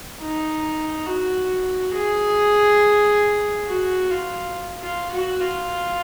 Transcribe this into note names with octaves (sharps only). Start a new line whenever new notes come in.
D#4
F#4
G#4
F#4
F4
F4
F#4
F4